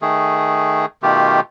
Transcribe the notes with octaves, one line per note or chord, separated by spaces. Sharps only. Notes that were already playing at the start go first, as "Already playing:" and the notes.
D#3 A3 G#4
B2 D#3 A3 F4 G4